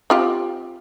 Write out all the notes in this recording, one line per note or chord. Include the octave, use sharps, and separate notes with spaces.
C4 F4 G4